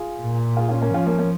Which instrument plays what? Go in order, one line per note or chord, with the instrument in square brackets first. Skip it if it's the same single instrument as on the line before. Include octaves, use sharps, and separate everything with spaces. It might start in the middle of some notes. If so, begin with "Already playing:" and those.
Already playing: [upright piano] F4 G#4
[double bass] A#2
[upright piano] F4 G#4
C#4 F4
A#3 C#4
[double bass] F3 [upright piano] C#4 F4
[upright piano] A#3 C#4
A#3 C#4